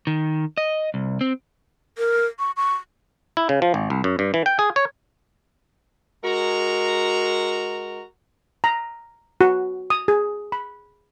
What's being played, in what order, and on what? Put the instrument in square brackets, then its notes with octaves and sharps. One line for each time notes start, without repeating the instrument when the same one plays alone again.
[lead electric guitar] D#3
D#5
C2
C4
[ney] A#4
C#6
C#6
[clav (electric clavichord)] E4
C#3
F3
G#1
C2
F#2
G2
E3
G5
G#4
C#5
[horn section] G#3 F#4 A#4 A#5
[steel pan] A#5
F#4
D#6
G#4
B5